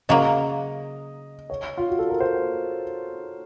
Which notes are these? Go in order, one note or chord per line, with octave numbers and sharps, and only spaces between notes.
C#3 F#3 A#3 D#5
C#5
F4
F#4
A4
A#4
C5